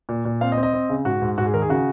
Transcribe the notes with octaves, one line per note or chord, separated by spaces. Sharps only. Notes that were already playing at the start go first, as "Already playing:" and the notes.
A#2
A#2
C4 F5
D#5
C4
D#5
C4
C#3
G#2 F#4
G#2
G#2 F#4
G#4
D#3 A#4
G#4
C#3 F#4